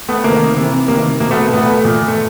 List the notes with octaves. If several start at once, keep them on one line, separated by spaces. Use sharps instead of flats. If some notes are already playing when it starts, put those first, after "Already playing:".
A3 B3
C3 D#3 A#3
C3 E3
C3 D#3 A#3
B2 A#3
A3 B3
A#2 A3 B3
A#2
A3